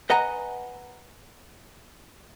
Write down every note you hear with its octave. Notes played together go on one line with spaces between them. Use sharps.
B4 D#5 F#5 G#5 A#5